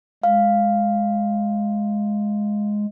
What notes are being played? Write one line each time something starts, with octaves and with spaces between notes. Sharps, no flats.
G#3 F5